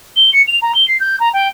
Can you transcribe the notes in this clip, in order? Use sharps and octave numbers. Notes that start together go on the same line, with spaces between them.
G7
C#7
F7
A#5
G7
C7
G6
A#5
G5